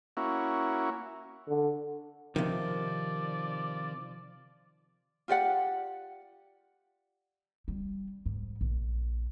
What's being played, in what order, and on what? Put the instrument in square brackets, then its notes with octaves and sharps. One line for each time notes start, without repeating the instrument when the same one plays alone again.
[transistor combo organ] A#3 C#4 E4 F#4
[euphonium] D3
[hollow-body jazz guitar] C3 D#3 [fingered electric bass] F3 [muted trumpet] D5
[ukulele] F4 G4 D5 F#5
[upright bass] G3
G#2
A#1